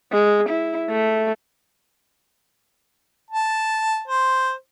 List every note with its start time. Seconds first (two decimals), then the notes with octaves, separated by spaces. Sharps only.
0.12 G#3
0.49 E4
0.90 A3
3.31 A5
4.08 C5